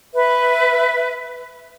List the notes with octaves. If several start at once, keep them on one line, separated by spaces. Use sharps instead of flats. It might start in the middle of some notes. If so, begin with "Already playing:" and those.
B4 E5